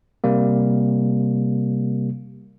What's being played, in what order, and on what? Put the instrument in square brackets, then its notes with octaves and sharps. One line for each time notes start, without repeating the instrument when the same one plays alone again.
[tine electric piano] C3 G3 A#3